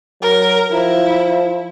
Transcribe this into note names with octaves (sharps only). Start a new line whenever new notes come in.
F#3 A#4
F3 E4